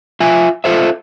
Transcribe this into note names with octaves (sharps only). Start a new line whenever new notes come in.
F4 E5 G#5
F4 A4 C5 E5